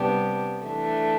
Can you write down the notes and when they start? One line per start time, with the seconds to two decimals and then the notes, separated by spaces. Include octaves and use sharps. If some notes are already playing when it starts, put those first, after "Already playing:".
Already playing: C3 G3 B3 D4 G4
0.64 E3 A3 D4